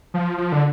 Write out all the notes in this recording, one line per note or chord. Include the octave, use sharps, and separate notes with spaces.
F3
F3
D3